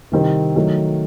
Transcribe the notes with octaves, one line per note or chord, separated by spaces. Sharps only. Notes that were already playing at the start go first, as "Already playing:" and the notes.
C3 D#3 G3 C4
D#3 F#3 A3